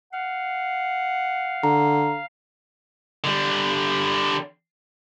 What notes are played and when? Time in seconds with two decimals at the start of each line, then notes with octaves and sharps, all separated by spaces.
0.13 F5 F#5
1.63 D3 A#5
3.24 D3 G3